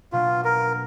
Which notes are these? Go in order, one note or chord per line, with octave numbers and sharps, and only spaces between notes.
B2 F#3 A#3 D4 F4
A#4